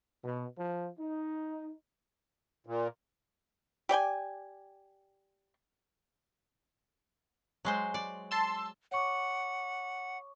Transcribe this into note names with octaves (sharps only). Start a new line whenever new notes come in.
B2
F3
D#4
A#2
G4 D5 G5 G#5
F#3 G#3 C5
D5
A5 C6 E6
C#5 F#5 C#6 D6